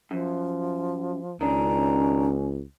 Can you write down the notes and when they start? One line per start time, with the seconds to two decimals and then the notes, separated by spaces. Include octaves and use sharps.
0.11 F#2 F3
1.41 C#2 D#3 C#4 D4 A#5